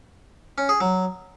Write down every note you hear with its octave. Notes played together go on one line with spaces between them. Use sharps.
C#4
G#4
F#3